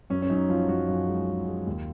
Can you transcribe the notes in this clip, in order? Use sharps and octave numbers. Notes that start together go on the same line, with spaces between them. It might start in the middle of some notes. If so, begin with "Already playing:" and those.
F#2 C#4
C#4
F#2 D#4
F3 F4
F#2 F#4
F#2 F4
G#3
G#3
G#3
D#2